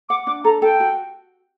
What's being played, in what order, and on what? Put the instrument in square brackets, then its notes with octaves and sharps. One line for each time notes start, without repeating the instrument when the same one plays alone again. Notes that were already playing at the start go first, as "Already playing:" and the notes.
[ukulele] F#5 [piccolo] D6
[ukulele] D4 [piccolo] D6
[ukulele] A4 [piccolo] A#5
[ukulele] A4 [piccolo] G5
[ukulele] F#4